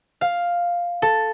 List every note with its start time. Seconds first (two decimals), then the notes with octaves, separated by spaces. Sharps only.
0.21 F5
1.02 A4